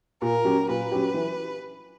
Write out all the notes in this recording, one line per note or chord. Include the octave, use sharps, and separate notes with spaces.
A#2 A#4
F#3 C#4 G4
A#2 B4
F#3 C#4 G4
E3